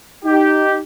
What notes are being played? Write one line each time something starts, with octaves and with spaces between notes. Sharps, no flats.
D#4 G4